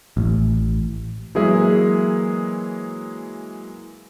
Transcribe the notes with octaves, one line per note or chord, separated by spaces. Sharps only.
A1
E3 F#3 G#3 A#3 G#4 E5